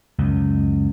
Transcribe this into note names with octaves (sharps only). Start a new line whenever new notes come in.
C#2 F#2